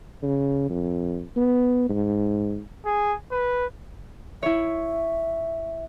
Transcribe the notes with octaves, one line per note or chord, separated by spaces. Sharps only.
C#3
F2
B3
G#2
G#4
B4
E4 C#5 E5